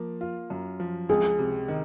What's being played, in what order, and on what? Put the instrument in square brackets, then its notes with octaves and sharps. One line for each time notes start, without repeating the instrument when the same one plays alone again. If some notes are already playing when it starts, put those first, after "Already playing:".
Already playing: [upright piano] F3 A#3
F4
F#2
F3
[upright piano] C#2 [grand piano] G#4
[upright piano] C3
D#3